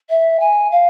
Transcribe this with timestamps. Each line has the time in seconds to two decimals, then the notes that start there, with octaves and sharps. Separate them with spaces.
0.09 E5
0.40 G#5
0.71 F5